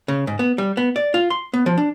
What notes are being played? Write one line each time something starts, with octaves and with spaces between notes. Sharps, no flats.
C#3
G#2
B3
G3
B3
D5
F4
C6
B3
F3
D4